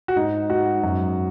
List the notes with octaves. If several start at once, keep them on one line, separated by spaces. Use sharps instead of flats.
F#4
G#2 D#4
G#2 F#4
F#2